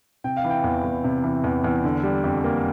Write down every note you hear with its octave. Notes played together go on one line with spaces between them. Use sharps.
C3 G5
F5
E3
G5
E2
E2
C3
E3
E2
E2
D3
G3
F2
A#3